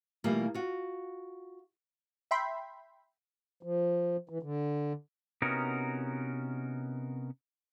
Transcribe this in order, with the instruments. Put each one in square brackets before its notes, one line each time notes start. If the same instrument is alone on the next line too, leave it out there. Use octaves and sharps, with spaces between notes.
[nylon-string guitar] B2 E3 G3 A3 A#3 F4
F4 F#4
[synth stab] E5 G5 B5 C6
[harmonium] F3
E3
D3
[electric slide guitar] C3 B3 C#4 D#4 F#4 A#4